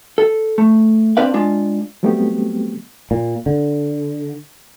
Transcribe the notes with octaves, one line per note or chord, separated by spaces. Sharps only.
A4
A3
C4 D4 B4 D5 F5
G#3 D4 F4
F#3 G3 A3 B3 C4 G4
A#2
D3